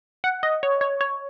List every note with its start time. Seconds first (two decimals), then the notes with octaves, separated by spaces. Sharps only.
0.24 F#5
0.43 D#5
0.63 C#5
0.81 C#5
1.01 C#5